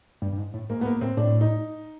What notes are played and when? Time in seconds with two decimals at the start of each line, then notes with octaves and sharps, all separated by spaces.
0.22 G2
0.33 G2
0.38 G#2
0.54 A2
0.69 G#2 A#3
0.80 A2 B3
0.85 G#2 A#3
1.01 A2 C4
1.17 A2 D4
1.41 D#4